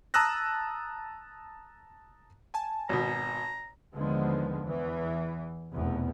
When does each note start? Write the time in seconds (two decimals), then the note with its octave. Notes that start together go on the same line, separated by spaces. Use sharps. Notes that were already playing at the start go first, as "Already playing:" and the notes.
0.14 A5 A#5 D#6 E6 F#6 A#6
2.54 G#5 A5
2.89 G#1 B2 A#5
3.94 D#2 D3 D#3 F3 G#3 B3
4.64 E2 E3
5.72 F1 E2 B2 B3